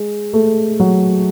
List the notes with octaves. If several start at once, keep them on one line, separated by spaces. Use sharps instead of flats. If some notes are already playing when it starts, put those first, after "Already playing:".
Already playing: G#3
A3
F#3